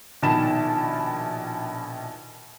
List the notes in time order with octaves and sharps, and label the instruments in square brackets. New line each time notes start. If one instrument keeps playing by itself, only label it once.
[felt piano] A#1 B2 D#3 A5 B5 E7